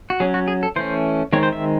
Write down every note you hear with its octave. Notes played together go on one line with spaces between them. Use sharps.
F#4
F#3 C#4 G#4
F#4
G#4
A4
E3 A3 C#4 C5
D#3 G#3 C4 C#5
C5
E5